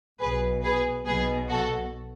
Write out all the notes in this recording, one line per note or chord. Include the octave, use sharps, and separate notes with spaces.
B1 B2 G#4 B4
G#4 B4
B1 B2 G#4 B4
F#4 A4